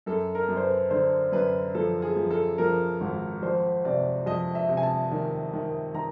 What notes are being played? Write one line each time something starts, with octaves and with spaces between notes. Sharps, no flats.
F#2 A4
A#4
F#2
C5
B4
D3 C5
F#2 B4
F3 A4
G#4
F3
A4
F3 A#4
G#1
F2 C5
C3 D5
F2 D#5
E5
C3
G#5
A5
D#3
D#3
D#3 A#5